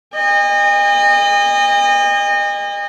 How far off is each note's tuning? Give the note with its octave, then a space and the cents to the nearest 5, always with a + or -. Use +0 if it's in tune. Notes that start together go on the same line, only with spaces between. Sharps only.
D#5 -25 G#5 -45